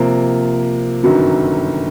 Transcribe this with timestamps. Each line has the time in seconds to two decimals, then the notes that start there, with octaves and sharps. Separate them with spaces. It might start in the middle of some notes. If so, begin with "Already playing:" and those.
Already playing: C3 F3 A#3
1.03 G1 F#2 D#3 F#3